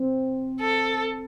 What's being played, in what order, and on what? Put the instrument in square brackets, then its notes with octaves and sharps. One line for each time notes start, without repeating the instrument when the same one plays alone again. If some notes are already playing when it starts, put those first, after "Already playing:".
Already playing: [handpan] C4
[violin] A4